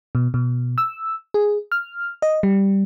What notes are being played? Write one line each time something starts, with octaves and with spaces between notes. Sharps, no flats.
B2
B2
E6
G#4
F6
D#5
G3